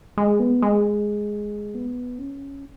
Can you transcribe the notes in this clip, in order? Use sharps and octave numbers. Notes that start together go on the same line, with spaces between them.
G#3
B3
G#3
B3
C#4